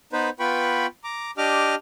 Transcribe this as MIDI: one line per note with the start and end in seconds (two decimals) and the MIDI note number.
0.13 0.30 59
0.13 0.30 63
0.13 0.30 71
0.13 0.30 72
0.40 0.86 59
0.40 0.86 65
0.40 0.86 71
0.40 0.86 79
0.40 0.86 83
0.40 0.86 85
1.04 1.31 82
1.04 1.31 86
1.38 1.75 62
1.38 1.75 67
1.38 1.75 75
1.38 1.75 86
1.38 1.75 89